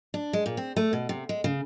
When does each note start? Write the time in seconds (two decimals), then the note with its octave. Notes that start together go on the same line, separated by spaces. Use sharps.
0.14 D4
0.33 G#3
0.46 A#2
0.57 C4
0.76 A3
0.93 B2
1.09 C3
1.29 G#3
1.44 C#3